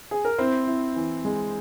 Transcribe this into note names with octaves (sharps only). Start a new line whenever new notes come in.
G#4
A#4
C4 E4 C5
E4
E3
G#3